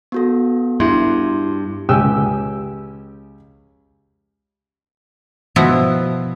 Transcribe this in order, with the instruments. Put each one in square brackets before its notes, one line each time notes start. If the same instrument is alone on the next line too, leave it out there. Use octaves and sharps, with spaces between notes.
[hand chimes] B3 F#4 A4
[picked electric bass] G2 [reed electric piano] E4 C6
[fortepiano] C#2 C#4 G4 G5 G#5 E6
[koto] B2 F3 B3 E4 F#4